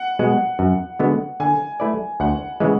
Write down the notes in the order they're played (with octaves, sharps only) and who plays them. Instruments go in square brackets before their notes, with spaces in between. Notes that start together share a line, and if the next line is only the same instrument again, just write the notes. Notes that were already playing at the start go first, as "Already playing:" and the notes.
Already playing: [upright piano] F#5
[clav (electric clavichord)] B2 G#3
F#2
D3 G#3 B3 F#4
[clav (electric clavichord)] D3 [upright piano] G#5
[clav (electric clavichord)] A3 E4 B4 D5
[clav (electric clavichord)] D2 [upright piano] F#5
[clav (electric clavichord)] C#3 E3 G#3